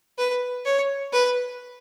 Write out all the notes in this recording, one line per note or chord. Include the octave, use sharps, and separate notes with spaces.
B4
C#5
B4